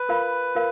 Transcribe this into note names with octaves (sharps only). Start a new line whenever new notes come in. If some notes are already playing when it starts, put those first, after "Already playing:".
Already playing: B4
F4 A#4 F5 B5
F4 A#4 F5